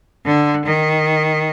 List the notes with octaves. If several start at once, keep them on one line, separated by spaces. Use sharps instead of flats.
D3
D#3